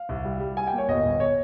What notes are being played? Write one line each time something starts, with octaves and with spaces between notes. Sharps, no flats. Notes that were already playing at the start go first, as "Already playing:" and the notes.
Already playing: F5
C2
G3
G3
G3 G#5
G5
A#3 C#5
G1 D#5
G1
C#5